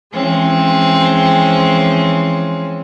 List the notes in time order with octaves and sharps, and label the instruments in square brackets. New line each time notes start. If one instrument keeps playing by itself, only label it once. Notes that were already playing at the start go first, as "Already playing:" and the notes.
[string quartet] E3 F3 G#3 C4 C#4